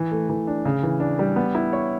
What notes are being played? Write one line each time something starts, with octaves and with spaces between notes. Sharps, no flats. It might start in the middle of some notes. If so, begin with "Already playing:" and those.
Already playing: E3
A3
E3
D4
C#3
E3
D4
G3
B3
E4
C#5